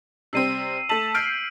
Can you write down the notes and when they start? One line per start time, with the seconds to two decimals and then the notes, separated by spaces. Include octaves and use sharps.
0.33 C3 G3 C4 E6 C7 D#7
0.89 A3 A5 E6 B6 F#7
1.15 F6 G6 C7 D7